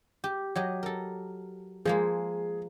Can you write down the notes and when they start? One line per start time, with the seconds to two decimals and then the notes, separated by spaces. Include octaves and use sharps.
0.24 G4
0.56 F#3 G4 D#5
0.83 A4 A#4
1.85 F3 G#3 A#3 G#4